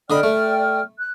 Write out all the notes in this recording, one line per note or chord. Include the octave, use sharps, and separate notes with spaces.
D3 D5 D#5 G5 B5 F6
A3
F#6